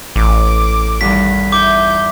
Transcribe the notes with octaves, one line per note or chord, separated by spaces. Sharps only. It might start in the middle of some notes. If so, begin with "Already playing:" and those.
A1 D6
E2 G2 D#3 B6
D4 E4 D6 G6